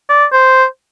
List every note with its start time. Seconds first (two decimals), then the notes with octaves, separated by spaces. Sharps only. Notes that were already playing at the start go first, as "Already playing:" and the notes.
0.09 D5
0.32 C5